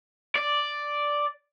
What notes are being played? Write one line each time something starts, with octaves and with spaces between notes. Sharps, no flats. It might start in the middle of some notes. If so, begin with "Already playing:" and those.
D5